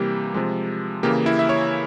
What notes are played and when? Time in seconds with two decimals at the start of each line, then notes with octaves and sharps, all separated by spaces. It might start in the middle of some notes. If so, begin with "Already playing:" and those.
Already playing: C3 E3 G3 A#3 G4
0.34 C3 F3 G#3
1.03 C#3 E3 A#3 G4
1.26 E4
1.39 E5
1.49 C#5